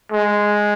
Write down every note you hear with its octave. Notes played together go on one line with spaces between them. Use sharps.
G#3